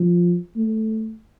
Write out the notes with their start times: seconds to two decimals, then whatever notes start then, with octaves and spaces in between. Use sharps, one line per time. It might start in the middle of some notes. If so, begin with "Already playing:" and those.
Already playing: F3
0.56 A3